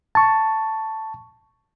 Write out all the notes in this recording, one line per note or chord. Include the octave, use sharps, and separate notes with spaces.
A5 C#6